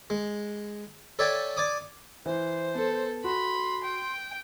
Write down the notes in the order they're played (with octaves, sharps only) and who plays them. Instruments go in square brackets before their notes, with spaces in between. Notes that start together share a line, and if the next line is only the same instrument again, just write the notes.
[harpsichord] G#3
A4 C#5 D5 E5 G5 G#5
D5 G#5 D6 D#6
[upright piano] E3 [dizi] C5
[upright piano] B3 [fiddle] A4
[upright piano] F#4 [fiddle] B5 [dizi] C6
[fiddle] G5